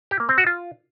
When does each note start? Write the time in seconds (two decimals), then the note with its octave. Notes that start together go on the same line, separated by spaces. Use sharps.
0.11 G4
0.20 A#3
0.29 C4
0.38 F#4
0.47 F4